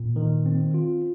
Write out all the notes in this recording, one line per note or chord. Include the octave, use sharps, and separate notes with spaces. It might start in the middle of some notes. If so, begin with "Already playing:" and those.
Already playing: A#2
D#3
C4
F4